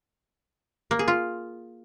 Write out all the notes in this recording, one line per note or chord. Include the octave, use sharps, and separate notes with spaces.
A#3
G#4
F4